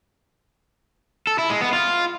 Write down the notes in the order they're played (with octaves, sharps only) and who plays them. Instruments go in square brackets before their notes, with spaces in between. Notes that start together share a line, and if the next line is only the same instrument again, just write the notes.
[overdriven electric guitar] A4
E4
G#3
B3
F4